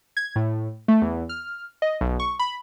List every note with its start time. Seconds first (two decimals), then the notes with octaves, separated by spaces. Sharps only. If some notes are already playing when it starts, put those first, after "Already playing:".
0.17 G#6
0.36 A2
0.88 A3
1.02 E2
1.29 F6
1.82 D#5
2.01 B1
2.20 C#6
2.39 B5